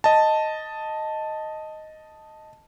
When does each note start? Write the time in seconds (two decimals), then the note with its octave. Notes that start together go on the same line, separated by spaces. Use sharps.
0.04 D#5 A5